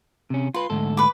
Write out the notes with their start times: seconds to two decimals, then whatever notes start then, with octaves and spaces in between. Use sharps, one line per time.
0.30 C3 C#4
0.54 F4 B4 C6
0.70 D2 G#2 A4
0.97 B4 D6